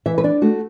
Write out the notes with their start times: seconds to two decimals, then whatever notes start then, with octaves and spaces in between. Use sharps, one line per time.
0.06 E3 E5
0.18 B4
0.24 D4 D5
0.42 A3 F#4